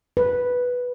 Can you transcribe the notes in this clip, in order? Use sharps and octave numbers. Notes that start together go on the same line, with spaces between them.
B4